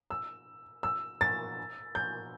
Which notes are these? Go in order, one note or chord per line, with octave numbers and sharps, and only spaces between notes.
E6
E6
A6
G6